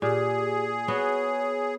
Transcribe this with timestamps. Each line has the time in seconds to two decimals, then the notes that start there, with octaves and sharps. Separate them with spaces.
0.02 A#2 G4 G#4
0.88 B3 F#4 C#5